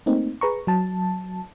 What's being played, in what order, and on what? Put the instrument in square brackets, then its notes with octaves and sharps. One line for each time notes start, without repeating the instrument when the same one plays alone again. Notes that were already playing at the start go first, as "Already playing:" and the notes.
[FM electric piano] A3 A#3 C4 D#4
G#4 B4 A#5 C#6
F#3 A5